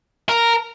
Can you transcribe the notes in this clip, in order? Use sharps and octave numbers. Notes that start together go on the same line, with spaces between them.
A#4